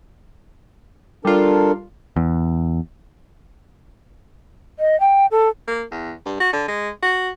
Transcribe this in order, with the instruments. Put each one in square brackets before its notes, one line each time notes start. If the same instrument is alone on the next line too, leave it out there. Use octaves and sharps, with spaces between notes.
[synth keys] G3 F4 [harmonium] D4 A4 A#4
[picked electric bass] E2
[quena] D#5
G5
A4
[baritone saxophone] A#3
E2
G2
F#4
D3
G#3
F#4